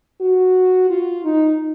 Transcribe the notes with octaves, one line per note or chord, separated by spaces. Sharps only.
F#4
F4
D#4